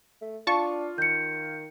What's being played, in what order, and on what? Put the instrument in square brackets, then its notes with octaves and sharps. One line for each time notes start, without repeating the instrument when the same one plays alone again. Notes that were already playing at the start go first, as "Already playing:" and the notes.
[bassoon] A3
[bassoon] D4 [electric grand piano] F4 F5 [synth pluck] A5 C#6
[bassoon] D#3 [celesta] G6 C#7